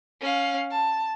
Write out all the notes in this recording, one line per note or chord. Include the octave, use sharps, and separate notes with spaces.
C#4 F5
A5